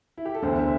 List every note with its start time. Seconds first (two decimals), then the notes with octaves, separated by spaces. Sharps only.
0.18 E4
0.25 G4
0.35 A4
0.42 E1 D2 D3 C5
0.58 E5